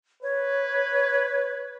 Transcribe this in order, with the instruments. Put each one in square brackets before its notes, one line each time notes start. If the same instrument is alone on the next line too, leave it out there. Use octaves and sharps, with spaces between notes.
[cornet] B4 [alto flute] C#5